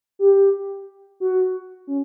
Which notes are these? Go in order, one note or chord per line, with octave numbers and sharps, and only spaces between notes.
G4
F#4
C#4